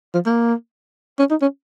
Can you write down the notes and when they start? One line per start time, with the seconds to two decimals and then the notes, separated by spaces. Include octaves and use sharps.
0.14 F3
0.26 A#3
1.19 C#4
1.31 D#4
1.42 C#4